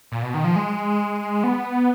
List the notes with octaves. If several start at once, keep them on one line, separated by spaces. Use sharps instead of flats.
A#2
B2
D#3
F3
G#3
B3